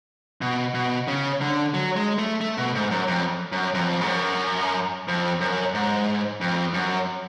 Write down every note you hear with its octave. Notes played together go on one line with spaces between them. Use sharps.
B2
B2
C#3
D3
F#3
G#3
A3
A3
B2
G#2
F#2
F2
F#2
F2
G#2
F#2
F2
F#2
G#2
F2
F#2